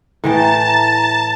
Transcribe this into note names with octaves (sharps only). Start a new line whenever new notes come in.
A2 E3 G5 A5 A#5